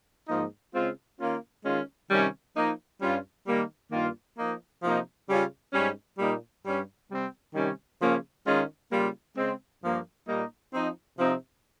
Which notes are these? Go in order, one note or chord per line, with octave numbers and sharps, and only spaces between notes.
G#2 F3 A#3 D#4
C#3 G#3 C4 F4
D#3 A#3 C#4 F4
D#3 G#3 C#4 F4
C3 D#3 G3 C#4
F3 A#3 D#4
G2 G3 C#4 F4
D#3 G3 A#3
G2 D#3 A#3 F4
F3 A#3 D#4
C3 F3 A#3 D#4
C#3 G3 C#4 F4
G#2 G3 C#4
A#2 G3 A#3 D#4
G2 G3 C#4
C3 G3 C4
C3 D#3 G3 C#4
C#3 F3 A#3 C#4
D#3 G#3 C#4 F4
C#3 G3 A#3 F4
C#3 G#3 C4
G2 F3 A#3
A#2 G3 A#3 D#4
F3 C4 D#4
C3 F3 C4 D#4